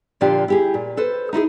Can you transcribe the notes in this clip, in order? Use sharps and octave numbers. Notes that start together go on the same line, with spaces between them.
A#2 D3 F3 D4 F4 G4
E4 G4 G#4
A#2
A4 B4 C5
D#4 E4 F#4 G#4